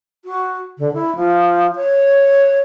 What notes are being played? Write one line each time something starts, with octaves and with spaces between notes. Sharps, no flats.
F#4
D3
E4
F3
C#5